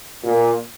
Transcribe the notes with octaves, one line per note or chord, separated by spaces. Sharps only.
A#2 A#3